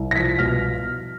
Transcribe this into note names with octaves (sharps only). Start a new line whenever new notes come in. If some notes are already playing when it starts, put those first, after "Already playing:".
Already playing: C2 C3
A#6
F3 B6
B2 F6